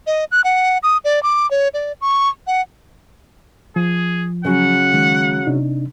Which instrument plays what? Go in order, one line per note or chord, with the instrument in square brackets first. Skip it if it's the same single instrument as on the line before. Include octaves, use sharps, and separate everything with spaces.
[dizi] D#5
F#6
F#5
D#6
D5
D6
C#5
D5
C#6
F#5
[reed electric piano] F3 [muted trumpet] G#4
[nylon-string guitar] C#3 F#3 [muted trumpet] F#5
[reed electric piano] D#3 G#3
C3 D4 D#4